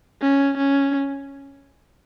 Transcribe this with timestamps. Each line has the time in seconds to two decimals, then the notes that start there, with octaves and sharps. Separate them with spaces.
0.21 C#4
0.58 C#4